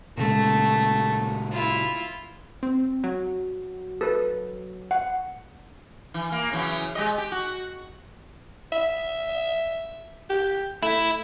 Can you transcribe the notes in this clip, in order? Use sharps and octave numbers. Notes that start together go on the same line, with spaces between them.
A#2 C#3 G#3 A3
E4 F4
C4
F#3
A4 B4
F#5
E3
A#3
C#3 E3 F#3
G#3 G4 D#5
G4
F#4
E5
G4
A3 E4